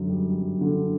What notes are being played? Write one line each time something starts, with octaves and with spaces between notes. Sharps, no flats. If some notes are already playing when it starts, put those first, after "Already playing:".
Already playing: F#2 D3
G3
F#2
D3